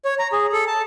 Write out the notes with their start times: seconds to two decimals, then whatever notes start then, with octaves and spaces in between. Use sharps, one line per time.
0.05 C#5
0.19 A#5
0.32 G#4
0.52 A4
0.67 A5